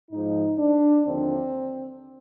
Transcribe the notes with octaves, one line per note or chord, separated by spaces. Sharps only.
G#2 F3 D#4
D4
D#2 D3 F3 C4